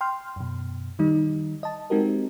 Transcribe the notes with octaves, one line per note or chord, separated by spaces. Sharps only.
G5 C6 F6
F#2 B2
D#3 G3 D#4
D#5 A5
G#3 C4 D#4 F#4 G4 A#4